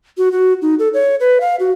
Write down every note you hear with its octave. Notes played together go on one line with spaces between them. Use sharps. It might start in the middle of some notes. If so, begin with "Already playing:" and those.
F#4
F#4
D#4
A4
C#5
B4
F5
F#4